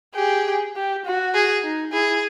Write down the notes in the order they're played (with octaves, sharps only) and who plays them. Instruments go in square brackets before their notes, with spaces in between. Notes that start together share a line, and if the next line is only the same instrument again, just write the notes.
[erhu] G4 [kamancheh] G#4
[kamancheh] G4
F#4
[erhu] G#4
[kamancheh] D#4
[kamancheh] E4 [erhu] G#4